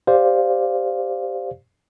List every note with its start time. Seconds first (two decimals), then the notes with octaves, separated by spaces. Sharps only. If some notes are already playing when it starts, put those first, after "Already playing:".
0.07 G4 C5 D5 F5